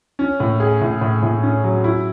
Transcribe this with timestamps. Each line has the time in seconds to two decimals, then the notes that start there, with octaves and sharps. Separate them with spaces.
0.19 C#4
0.40 A2
0.60 G#4
0.81 A2
1.01 A2
1.22 A2
1.43 C#4
1.64 F#3
1.84 E4